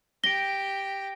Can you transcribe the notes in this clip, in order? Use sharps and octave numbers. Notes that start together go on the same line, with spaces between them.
G4 G5 A#6 D7 G7